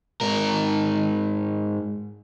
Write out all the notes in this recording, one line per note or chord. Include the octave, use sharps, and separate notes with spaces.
G#2 A#4